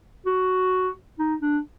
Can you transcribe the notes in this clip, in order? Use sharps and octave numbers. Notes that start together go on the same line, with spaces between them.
F#4
D#4
D4